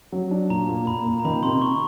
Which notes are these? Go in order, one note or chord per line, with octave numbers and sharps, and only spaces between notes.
F#3
D4
A#2 A#5
A#2
A#2 B5
A#2
A#5
D#3 B5
C3 C6
C3 C#6